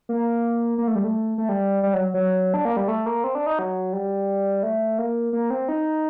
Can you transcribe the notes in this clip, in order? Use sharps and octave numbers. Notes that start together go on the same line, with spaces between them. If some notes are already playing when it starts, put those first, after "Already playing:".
A#3
A#3
A3
G3
A3
A3
G3
G3
F#3
F#3
D4
A#3
G3
A3
A#3
C4
D4
D#4
F#3
G3
A3
A#3
A#3
C4
D#4